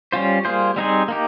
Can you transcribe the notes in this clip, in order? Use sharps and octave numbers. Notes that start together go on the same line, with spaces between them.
G3 C#4 F4 C5
G3 A#3 F4 G#4 C5
G3 C4 D#4 G#4 C5
A#3 D#4 G4